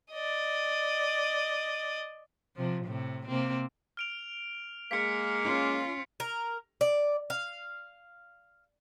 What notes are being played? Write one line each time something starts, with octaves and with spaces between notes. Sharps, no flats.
D5 D#5
C3 F3
A2 C3
C3 A#3 C4
F6 D7 F7
G#3 A#3 B6 C#7
C#4 F4
A#4
D5
F5